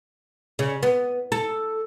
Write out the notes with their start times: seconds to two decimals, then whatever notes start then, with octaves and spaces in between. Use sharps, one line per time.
0.59 C#3
0.83 B3
1.32 A4